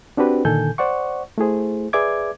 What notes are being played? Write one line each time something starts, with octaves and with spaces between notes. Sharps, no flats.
C4 D4 F#4 G4 B4
A#2 D3 D#3 A4 G#5 G6
C5 D5 F#5 C#6
A3 E4 G#4 C5
G#4 B4 D5 E5 D6 G#6